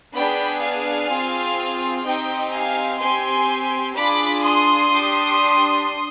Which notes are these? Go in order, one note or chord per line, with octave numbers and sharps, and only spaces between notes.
B3 D4 G#4 G5 B5
F5 G#5
C4 F4 G#4
C4 D#4 G4 D#5 G5
F5 G#5
C4 G4 G#5 C6
D4 F4 G#4 B5 D6
C6 D#6
D4 G4